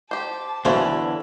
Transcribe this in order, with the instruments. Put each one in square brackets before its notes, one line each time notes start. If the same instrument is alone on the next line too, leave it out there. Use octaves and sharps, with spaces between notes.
[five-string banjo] G4 C5 [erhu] A5
[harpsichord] B1 C5 F5 [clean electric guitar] E2 D3 [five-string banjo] E3 E4 C#5